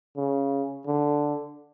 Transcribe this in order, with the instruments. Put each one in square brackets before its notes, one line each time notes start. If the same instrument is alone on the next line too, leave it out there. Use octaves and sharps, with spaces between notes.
[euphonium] C#3
D3